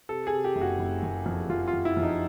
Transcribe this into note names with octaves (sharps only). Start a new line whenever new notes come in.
C3 A4
G#4
C3
G4
F#1
F#4
F#1
F#1
F2
F2 F4
F4
F#1
E4
F2
D#4